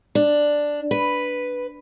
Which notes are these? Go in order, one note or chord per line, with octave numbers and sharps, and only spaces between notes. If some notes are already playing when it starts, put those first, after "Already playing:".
D4
B4